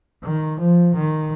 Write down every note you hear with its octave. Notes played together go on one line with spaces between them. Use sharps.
D#3
F3
D#3